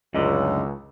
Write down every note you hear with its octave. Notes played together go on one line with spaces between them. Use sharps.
C#2 F#2 A2 D3 D#4